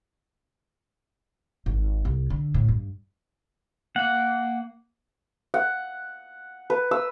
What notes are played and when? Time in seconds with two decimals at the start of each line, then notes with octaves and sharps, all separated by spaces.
1.66 G#1
2.05 C2
2.30 D3
2.54 A2
2.68 G2
3.96 A#3 F5 F#5
5.54 F#5
6.70 B4
6.91 E6